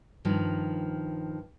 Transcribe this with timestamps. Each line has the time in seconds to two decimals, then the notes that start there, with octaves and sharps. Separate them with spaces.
0.25 G2 D#3 F3